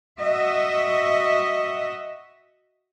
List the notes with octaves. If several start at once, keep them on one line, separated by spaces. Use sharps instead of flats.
F#4 D#5 E5